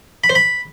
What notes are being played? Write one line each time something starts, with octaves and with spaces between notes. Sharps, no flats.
B5
C5
B5